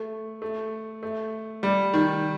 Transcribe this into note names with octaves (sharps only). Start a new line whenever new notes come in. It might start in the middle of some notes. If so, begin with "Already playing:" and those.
Already playing: A3
A3
A3
G3
D#3